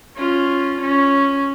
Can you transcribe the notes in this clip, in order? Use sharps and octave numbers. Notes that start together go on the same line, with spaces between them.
C#4 F4
C#4